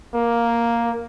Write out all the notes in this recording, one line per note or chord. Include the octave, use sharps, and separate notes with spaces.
A#3